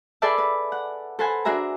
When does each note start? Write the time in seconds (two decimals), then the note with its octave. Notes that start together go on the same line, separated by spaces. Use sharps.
0.22 G#4 A4 B4 D5 E5 A5
0.38 B4
0.72 F#5
1.19 A4 B4 C5 F#5 G#5
1.45 D4 F#4 G#4 E5 A#5